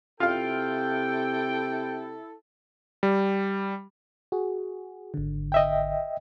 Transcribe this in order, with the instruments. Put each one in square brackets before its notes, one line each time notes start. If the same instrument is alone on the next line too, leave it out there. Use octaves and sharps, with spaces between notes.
[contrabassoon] C3 [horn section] E4 A4 [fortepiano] F4 F5 [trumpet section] G5
[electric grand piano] G3
[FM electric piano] F#4 G#4
G#1 D3
[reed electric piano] D#5 E5 G5